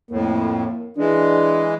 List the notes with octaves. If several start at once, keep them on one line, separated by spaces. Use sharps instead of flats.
F2 A2 A#3
E3 G#3 D4